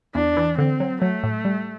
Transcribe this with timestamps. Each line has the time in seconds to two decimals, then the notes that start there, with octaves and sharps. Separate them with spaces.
0.15 E2 D4
0.37 E3
0.58 D3 C4
0.80 F#3
1.02 F#3 A3
1.23 A2
1.45 G3